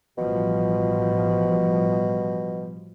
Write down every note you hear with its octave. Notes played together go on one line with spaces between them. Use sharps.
A1 B2 F3 G3